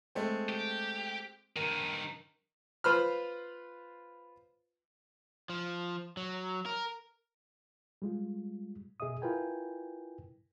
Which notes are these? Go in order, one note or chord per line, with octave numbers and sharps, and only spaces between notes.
G#3 A3 C4
G4
G2 D#3 A#4
F4 B4 C5 B5 F6
F3
F#3
A#4
G3 G#3 F4
B2 G#4 D#5 E5 D#6
E4 F4 A#4 B4 G5 G#5